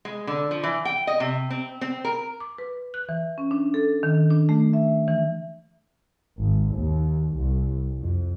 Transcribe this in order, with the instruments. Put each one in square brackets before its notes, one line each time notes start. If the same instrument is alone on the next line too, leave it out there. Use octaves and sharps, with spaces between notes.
[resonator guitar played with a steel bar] G#3
D3
F3
E3
G5
D#5
C3
C4
C4
A#4
[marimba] D6
B4
F#6
E3
C#4
D4
A4
D#3
D4
A3
E5
E3
[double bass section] G#1
D#2
C2
F2